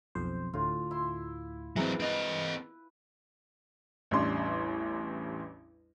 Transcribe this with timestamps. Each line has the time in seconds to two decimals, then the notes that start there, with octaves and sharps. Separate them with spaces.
0.15 B1 F2 C5
0.53 D2 A2 F4
0.91 E4 C6
1.76 E3 F#3 G#3 C4 A#4 B4
2.00 C4 D#5
4.11 A1 E2 G3 C#4 D4 C6